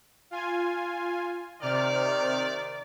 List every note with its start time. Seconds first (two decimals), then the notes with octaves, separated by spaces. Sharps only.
0.31 F4 G#5
1.61 C3 D#3 D5 F6